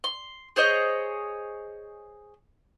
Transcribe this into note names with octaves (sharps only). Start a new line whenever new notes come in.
C6
G#4 C5 C#5 D#5